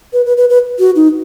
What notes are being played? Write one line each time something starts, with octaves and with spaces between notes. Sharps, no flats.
B4
B4
B4
B4
F#4
D#4